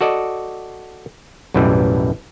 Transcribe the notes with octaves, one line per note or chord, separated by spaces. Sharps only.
F#4 A4 D5 D#5
B1 F#2 A2 E3 G3